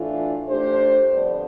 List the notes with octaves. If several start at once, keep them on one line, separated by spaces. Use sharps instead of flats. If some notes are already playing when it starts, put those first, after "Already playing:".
Already playing: A2 E3 A3 D4 F4
A3 D4 G4 C5
F2 D3 G3 B3 D4